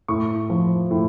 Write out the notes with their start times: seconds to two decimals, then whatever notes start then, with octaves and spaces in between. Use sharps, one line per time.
0.08 A2 C#6
0.50 F3
0.91 A2